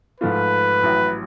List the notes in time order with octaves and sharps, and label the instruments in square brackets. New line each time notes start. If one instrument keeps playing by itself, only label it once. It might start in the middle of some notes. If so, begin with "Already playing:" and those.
[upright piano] G#2 F3 A3 F4 [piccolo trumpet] B4
[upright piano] A1 A2 F#3